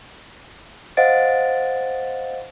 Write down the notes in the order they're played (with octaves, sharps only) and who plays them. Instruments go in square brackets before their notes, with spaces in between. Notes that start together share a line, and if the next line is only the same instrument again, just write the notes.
[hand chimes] C5 D#5 F5 F#5 A6 D7